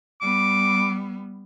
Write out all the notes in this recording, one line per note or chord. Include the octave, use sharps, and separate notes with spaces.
G3 B3 D6